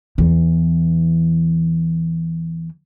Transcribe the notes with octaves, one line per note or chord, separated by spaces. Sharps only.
E2 E3